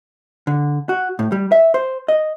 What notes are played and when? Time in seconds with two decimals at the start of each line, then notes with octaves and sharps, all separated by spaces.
0.47 D3
0.89 F#4
1.19 A2
1.32 G3
1.52 E5
1.74 C5
2.08 D#5